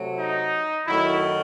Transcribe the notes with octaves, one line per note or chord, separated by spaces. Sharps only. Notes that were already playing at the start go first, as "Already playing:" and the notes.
Already playing: C3 F#3 A3
D#4
F#2 D#3 F#3 A3 E4